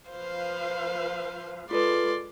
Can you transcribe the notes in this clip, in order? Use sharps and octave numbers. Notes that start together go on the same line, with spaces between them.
F3 B4 C5 F5
G#3 F4 A4 B4 D5 C6